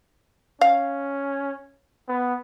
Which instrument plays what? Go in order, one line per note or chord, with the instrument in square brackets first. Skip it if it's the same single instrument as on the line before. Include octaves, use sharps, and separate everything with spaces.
[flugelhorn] C#4 [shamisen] F5
[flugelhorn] B3